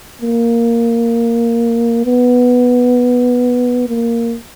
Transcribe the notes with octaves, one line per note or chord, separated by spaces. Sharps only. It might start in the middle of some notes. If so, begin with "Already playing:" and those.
A#3
B3
A#3